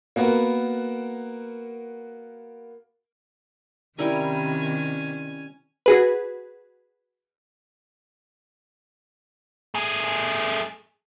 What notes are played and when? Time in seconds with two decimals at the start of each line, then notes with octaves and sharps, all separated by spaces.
0.16 A#3 B3 F#4 A#4
3.99 C3 D#3 G3 C#4 E4 A#4 G#5
5.86 F#4 G#4 B4
9.75 A3 G#4